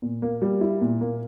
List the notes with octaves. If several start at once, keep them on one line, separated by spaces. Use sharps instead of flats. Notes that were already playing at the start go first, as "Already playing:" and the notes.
A#2
A#3
G3
E4
A#2
A#3